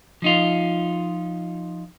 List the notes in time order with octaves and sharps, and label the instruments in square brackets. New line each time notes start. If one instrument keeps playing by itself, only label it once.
[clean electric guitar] F3 D#4 F4